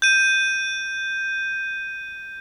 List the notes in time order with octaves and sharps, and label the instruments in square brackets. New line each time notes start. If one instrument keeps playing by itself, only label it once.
[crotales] G6 D#7